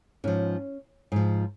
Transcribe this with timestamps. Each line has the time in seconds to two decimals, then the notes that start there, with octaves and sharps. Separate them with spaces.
0.24 G#2 F3 C#4
1.12 G#2 F3